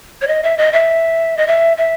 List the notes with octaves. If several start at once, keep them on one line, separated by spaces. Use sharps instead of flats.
C#5
D#5
E5
D#5
E5
D#5
E5
E5